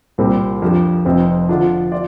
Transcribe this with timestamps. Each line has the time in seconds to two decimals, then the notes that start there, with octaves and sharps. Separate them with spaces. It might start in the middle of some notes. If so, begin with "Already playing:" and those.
0.18 C2 A#2 G3 C4 A#4
0.62 F2 F3 D4 G4 A#4
1.05 F1 F2 F3 C4
1.49 D3 F3 D4 F4
1.92 F4 D5